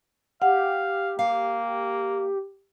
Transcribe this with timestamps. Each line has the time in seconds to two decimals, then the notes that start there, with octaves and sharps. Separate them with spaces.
0.42 G4 F5 F#5
1.19 A#3 F5